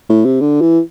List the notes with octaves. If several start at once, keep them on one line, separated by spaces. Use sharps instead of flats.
A2
C3
D3
E3